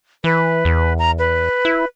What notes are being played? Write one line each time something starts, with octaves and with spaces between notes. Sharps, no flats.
E3 B4
E2
A#5
B4
E4